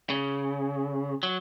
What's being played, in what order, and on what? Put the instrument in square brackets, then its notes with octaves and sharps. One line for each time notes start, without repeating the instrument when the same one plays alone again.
[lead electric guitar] C#3
F#3